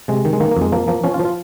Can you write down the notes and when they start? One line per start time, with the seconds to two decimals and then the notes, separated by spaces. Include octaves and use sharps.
0.08 C3 G#3
0.25 D#3
0.33 G#3
0.40 D#3 A#3
0.51 A#3
0.57 F2 G#3
0.72 F3 A#3
0.88 F3 A#3
1.04 F3 C#4
1.14 F4
1.20 F3
1.25 F4